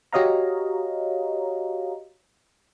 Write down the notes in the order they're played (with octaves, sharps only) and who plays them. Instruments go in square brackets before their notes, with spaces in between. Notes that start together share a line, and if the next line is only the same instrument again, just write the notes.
[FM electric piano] F#4 G4 C#5 D#5 F5 A#5